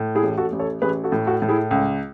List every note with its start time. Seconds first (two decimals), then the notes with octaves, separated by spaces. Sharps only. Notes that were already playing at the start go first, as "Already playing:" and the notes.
Already playing: A2
0.15 E4 G#4
0.23 A1
0.38 F#4 A4
0.52 A1
0.59 A4 C#5
0.82 A1 G#4 B4
1.04 F#4 A4
1.12 A2
1.26 F#4 A4
1.42 A2
1.48 E4 G#4
1.71 C#2